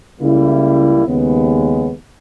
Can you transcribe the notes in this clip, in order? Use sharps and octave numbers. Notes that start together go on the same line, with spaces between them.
C#2 C#3 G3 A#3 E4
D#2 C#3 G#3 B3